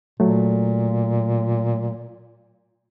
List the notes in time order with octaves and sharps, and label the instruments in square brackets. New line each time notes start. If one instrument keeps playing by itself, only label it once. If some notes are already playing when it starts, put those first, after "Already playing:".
[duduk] A#2 [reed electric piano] F#3 A3